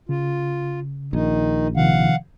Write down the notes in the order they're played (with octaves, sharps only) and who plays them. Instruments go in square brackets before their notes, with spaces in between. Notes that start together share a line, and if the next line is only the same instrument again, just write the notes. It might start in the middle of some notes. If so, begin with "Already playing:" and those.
[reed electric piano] C#3 [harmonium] F4
[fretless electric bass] A#1 [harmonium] D#3 D#4
[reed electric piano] C3 D#3 F3 [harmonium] F5 F#5